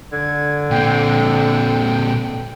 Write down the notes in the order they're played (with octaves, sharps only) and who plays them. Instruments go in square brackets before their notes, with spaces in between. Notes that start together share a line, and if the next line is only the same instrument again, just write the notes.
[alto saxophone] D3 [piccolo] G#6
[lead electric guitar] A#2 C4 [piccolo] G5
[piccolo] G5